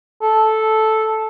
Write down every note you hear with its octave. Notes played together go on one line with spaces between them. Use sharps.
A4